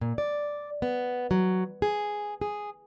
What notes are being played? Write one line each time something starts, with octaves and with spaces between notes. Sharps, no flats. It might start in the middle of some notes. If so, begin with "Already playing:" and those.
A#2
D5
B3
F#3
G#4
G#4